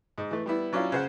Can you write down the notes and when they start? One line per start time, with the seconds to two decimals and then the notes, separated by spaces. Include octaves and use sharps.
0.18 G#2
0.31 E3 A3
0.46 G3 B3 E4
0.73 F#3 C#4 D4 E4 F4
0.92 C#3 C5 F#5